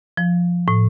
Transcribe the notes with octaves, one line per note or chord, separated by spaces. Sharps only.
F3
A2